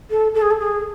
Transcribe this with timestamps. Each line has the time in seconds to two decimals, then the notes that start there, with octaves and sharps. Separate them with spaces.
0.10 A4
0.34 A4
0.42 G#4
0.51 A4
0.60 G#4